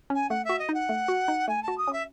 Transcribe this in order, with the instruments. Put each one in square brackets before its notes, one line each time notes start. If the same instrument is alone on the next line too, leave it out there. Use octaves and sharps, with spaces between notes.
[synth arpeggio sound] C#4 [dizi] G#5
[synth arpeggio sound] A3 [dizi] F#5
[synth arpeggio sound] F#4 [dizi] E5
[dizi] D#5
[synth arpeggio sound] D#4
[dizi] F#5
[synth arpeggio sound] A3
F#4
D#4
[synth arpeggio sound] A3 [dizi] G#5
[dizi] A5
[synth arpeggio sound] F#4
[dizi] D#6
[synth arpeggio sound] C#4
[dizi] E5